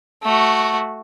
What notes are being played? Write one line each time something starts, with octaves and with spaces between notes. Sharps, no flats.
A3 F#4